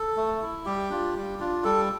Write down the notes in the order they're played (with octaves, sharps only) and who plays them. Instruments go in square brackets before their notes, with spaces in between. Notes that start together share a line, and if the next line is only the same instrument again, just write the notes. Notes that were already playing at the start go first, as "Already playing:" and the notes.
Already playing: [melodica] A4
A3
E4
G3 G4
D4 F4
G3
D4 F4
G3 A4